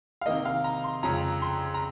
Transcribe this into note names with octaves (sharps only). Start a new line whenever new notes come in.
F5
C3 D#3 A#3 D#5
F5
A#5
C6
F2 C#3 G#3 C#4 F4 A#5
C6
A#5